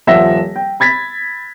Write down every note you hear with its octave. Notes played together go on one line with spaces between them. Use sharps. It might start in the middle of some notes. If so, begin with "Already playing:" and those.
D#1 F3 E5 F#5 A#6
G5
B5 G#6 A6 B6